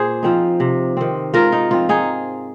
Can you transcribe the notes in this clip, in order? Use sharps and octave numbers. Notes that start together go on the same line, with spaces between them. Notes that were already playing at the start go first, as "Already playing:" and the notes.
Already playing: A#2 G#4 C5
F3 C4 D#4
C3
D#3 C4
G#2 F4 A#4
D#4
F3 C4 F4
D#4 G#4